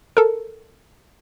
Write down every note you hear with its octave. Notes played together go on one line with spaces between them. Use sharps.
A4 A#4